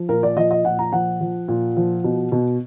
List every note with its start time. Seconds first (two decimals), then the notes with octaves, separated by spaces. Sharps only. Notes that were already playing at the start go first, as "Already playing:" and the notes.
Already playing: F3
0.09 A#2 A#4
0.23 D5
0.37 F3 D#5
0.51 D#5
0.65 A#2 F#5
0.79 A#5
0.93 F3 F#5
1.21 F3
1.48 A#2
1.77 F3
2.04 B2
2.32 B2